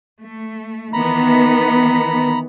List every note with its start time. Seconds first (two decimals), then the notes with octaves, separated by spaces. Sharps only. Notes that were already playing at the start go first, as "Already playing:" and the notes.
0.22 A3
0.93 D#3 E3 B3 A#5 B5